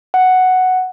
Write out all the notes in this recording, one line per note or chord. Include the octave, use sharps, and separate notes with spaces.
F#5